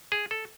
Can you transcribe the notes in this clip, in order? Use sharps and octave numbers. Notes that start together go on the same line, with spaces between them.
G#4
A4